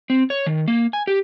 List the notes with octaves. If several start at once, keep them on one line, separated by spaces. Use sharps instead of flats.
C4
C#5
D#3
A#3
G#5
G4